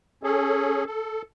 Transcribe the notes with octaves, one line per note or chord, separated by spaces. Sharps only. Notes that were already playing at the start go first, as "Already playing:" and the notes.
C#4 G#4 A4
A4